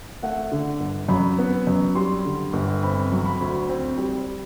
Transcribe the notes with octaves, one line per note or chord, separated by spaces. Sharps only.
A3 F#5
D3
G1
F#2 B5
B3
F#2
G3 C6
D3
G1
C4 B5
F#3
B5
D2
C4
G3